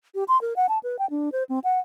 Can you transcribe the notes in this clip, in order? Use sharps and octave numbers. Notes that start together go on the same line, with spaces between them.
G4
C6
A#4
F#5
A5
B4
G5
D4
C5
C4
F#5